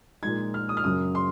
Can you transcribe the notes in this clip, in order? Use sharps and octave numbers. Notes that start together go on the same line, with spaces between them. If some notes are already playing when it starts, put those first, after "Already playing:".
A#2 F3 G#3 D#4 G#6
F6
D#6
F6
F#2 C#3 F#3 D#6
C6